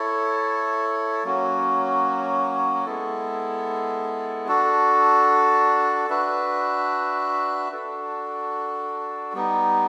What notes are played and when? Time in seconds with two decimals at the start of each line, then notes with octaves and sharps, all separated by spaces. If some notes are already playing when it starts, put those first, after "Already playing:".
Already playing: E4 A4 C#5
1.24 F#3 A#3 C#4 F#4
2.86 G#3 B3 E4 A4
4.48 D4 F#4 A4
6.09 D4 F#4 B4 E5
7.72 D4 F#4 A4
9.33 G3 B3 D#4